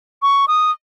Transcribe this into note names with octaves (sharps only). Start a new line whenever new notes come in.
C#6
D#6